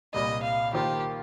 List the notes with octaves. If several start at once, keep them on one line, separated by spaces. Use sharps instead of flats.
C2 A#2 G3 D#5
F5
D#3 A#3 F4 G4 C5